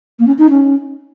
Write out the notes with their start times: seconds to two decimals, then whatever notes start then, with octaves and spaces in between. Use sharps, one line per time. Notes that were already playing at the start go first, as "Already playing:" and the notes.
0.19 A#3
0.26 C#4
0.38 D#4
0.49 C#4